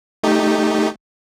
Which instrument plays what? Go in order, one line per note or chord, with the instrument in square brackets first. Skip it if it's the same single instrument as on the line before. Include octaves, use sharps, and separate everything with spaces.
[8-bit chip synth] A3 D#4 G4